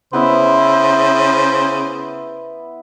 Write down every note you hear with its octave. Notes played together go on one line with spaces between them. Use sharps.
C#3 B3 E4 C5 E5